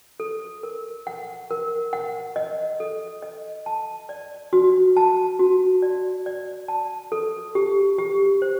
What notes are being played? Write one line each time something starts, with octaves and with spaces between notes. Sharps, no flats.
A4
A#4
F#5
A#4
F#5
D#5
A4
D#5
A5
D5
F#4
A5
F#4
D5
D5
A5
A4
G4
G4
C5